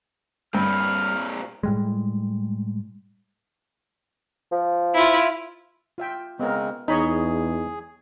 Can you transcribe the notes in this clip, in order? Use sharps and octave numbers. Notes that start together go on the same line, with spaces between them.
G2 A#2 C4 F6
A2 G3 G#3
F3
E4 F4
F4 E5 G5
C#3 G#3 B3 C4 A#4
E2 D#4 G#4 C#5 D#5 B5